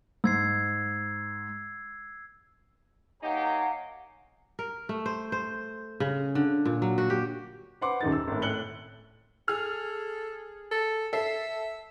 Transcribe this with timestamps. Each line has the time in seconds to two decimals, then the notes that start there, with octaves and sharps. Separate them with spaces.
0.24 G#2 E6 G#6 C7
3.23 A#3 D#4 G4 C#5 F5 F#5 G#5 A#5
4.59 A#4
4.89 A3
5.06 C5
5.32 C5
6.00 C#3
6.35 D3
6.65 A#2
6.82 F#3
6.98 F#4
7.10 G4
7.81 B4 C5 F#5 C6 D6
8.01 D#1 F#2 D#3 D#4 A6
8.12 E6
8.27 G#1 A2
8.42 A2 F#6 C#7 F#7 G7
9.48 G#4 A4 F6
10.71 A4
11.13 A4 E5 C7